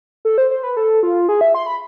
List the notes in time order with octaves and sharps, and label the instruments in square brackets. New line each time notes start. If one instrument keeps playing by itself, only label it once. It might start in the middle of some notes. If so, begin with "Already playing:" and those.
[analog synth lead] A4
C5
C5
B4
A4
F4
G#4
E5
C6
B5